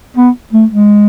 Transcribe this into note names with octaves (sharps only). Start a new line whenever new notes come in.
B3
A3
G#3